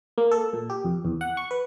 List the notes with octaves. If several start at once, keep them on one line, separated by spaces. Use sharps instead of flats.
A#3
A4
A#2
G4
F2
E2
F#5
C#6
B4